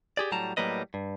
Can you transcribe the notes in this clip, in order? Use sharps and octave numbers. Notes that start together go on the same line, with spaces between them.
G4 G#4 D5
A2 F#3 G3 A5 A#5
A2 F#3 G3 A#3 B4 D#5
G2